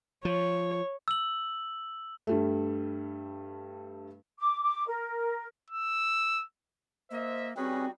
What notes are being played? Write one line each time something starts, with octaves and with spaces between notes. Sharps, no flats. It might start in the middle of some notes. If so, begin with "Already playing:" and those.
F3 C#5
E6 F#7
G2 G3 A3
D6
D6
A#4
E6
A#3 C5 D#5 E5
G3 C4 C#4 D#4 F#4 G#4 B4